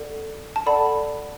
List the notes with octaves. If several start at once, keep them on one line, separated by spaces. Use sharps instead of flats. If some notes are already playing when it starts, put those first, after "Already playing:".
Already playing: A4 D5 F#5
A5
A4 D5 F#5 B5